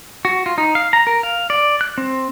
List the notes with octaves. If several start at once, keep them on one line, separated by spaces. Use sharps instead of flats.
F#4
F4
D#4
F5
A#5
A#4
F5
D5
F#6
C4